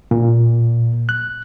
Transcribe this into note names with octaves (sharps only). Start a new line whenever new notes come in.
A#2
F#6